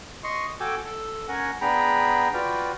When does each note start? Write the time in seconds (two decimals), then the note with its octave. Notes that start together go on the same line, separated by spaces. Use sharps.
0.24 D#5 C6 C#6
0.60 F#4 A4 G5 G#5 D6
0.85 A4
1.28 C#4 A#4 C#5 F#5 G#5
1.61 B3 D4 G#4 G5 A#5 B5
2.34 F4 F#4 B4 D5 G5